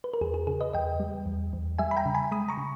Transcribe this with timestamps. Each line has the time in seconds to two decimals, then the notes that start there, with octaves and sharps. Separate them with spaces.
0.04 B4
0.14 A#4
0.21 E2 G#4
0.34 G#4
0.47 C#3 G#4
0.61 B4 D#5
0.73 E2 D#5 G5
1.00 G3
1.26 E2
1.53 E2
1.79 G3 E5 G#5
1.91 B5
1.97 G5 A#5
2.06 C#3
2.15 G#5 B5
2.31 G#3 B5 D#6
2.49 A#5 C#6
2.57 C#3